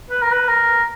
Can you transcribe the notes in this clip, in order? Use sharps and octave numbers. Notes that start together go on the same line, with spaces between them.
B4
A#4
B4
A#4